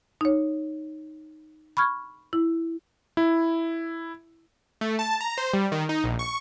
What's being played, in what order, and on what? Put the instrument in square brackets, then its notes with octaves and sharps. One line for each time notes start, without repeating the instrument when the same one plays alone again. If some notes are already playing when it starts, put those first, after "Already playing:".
[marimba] D#4 C#5
B5 C#6 F6 G#6
E4
[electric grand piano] E4
[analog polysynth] A3
A5
A#5
C5
G3
D#3
D#4
A#1
C#6